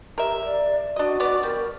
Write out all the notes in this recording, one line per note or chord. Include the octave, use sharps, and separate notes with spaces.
G4 A#4 E5
D5
D4 F#4 D#5
B3 D5
G3 A#4